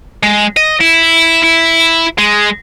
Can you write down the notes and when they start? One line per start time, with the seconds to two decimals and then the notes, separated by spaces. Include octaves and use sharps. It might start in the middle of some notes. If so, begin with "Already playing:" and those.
0.23 G#3
0.57 D#5
0.81 E4
1.44 E4
2.18 G#3